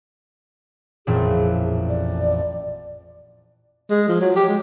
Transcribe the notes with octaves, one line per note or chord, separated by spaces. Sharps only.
A1 F2 A#2 G#4
D5
G#3
F3
F#3
G4
G#3